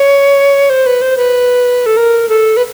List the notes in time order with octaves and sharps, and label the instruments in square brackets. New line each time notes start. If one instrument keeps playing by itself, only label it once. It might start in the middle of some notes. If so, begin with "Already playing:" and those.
Already playing: [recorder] C#5
C5
B4
C5
B4
A4
A#4
A4
B4